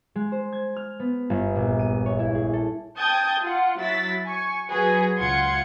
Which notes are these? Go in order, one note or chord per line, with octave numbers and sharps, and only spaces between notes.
G#3
C5
G#6
F6
B3
G1
A#1
D#7
C#5
E4
G#4
A4
G5 A5 D#6 G6 G#6
F4 F#5
F#3 E4 A6 B6
G#5 C#6
F#3 F#4 G#4 B4
C#2 F4 F#5 C6 G#6 C#7